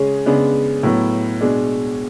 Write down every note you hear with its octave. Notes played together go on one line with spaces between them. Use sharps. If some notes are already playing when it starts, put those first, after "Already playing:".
Already playing: C#3 G#3 C#4 G#4
C#3 G#3 B3 D4
A2 F#3 B3
B2 G#3 D4